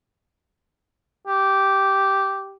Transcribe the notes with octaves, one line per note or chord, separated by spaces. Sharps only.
G4